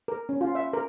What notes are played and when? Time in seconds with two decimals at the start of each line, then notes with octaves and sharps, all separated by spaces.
0.08 A#4
0.29 C#4
0.41 F4
0.55 E5
0.73 A#4